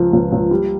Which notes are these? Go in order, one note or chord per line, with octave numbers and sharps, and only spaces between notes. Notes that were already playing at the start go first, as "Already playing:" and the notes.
Already playing: C#2 F3
C#2
C#2
G3